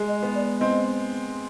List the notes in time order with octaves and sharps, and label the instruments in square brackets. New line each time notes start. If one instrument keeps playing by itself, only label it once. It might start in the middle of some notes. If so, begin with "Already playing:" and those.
Already playing: [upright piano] G#3
[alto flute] D#5
[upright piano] B3
[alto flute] D5
[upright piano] C4 [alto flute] D#5